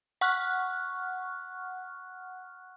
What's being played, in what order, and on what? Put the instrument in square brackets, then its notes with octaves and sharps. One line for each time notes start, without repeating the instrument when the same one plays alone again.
[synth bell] F#5 C#6 F6 F#6